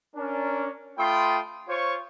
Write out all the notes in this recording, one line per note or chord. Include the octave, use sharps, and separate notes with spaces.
C#4 D4 A#4
A3 F4 G5 B5 C6 D#6
F4 C5 C#5 C#6